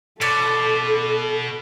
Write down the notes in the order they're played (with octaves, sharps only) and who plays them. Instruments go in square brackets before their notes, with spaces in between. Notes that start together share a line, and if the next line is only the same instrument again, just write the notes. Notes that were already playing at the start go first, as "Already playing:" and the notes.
[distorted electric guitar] B2 [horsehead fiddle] A4 [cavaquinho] C#5 D5 C6